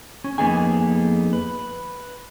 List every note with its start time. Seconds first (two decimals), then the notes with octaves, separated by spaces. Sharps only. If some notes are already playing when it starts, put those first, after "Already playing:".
0.24 C#4
0.38 F2 A#3 B3 D#4 G#4 G#5
1.33 B4